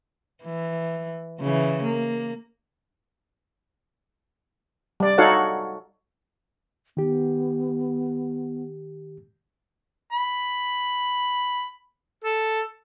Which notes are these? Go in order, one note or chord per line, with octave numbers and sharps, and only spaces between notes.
E3
C#3 E3
A#3
G3 D5
D#4 F#4 A4 C#5 F5 F#5
D#3 B3 G4
B5
A4